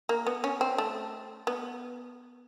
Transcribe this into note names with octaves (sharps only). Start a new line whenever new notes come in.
A#3
B3
C#4
C4
A3
B3